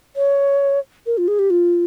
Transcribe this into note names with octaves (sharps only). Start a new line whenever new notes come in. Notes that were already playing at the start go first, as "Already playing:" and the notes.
C#5
A#4
F4
G#4
G4
F4